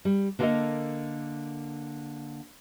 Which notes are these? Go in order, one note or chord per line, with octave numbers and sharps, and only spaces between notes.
G3
D3 A#3 B3 A4 A#4 D#5